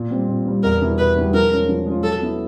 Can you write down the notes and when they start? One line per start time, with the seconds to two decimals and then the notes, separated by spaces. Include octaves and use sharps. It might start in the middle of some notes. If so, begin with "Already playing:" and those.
Already playing: A#2
0.11 G3 C4
0.28 A#2
0.46 G3 C4
0.63 E2 A#4
0.81 B2 G3 B3 E4
0.98 E2 B4
1.16 B2 G3 B3 E4
1.34 F3 A#4
1.51 G#3 C#4 F4
1.69 F3
1.86 G#3 C#4 F4
2.03 F#3 A4
2.22 B3 E4